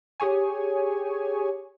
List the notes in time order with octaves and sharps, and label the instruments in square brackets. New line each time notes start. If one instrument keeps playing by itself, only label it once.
[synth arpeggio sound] G4 G#4 C#5 G#5